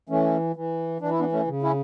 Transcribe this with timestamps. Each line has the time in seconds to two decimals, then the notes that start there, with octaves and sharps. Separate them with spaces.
0.09 E3 A3 C#4
0.56 E3
1.01 E3 D4
1.11 E4
1.20 B3 D4
1.32 A3 C#4
1.48 C#3
1.63 C#4 E4